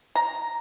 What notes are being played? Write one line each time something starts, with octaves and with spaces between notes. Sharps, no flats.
A#5